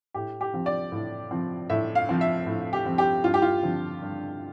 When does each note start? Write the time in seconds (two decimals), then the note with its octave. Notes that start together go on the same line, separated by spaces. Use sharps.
0.14 A2 G4
0.41 G4
0.54 F3 C4
0.66 D5
0.92 A2
1.31 F3 C4
1.70 A2 E5
1.95 F5
2.09 F3 C4
2.21 E5
2.47 A2
2.73 G4
2.86 F3 C4
2.98 G4
3.24 G2 F4
3.34 G4
3.42 F4
3.63 D3 F3 C4
4.01 G2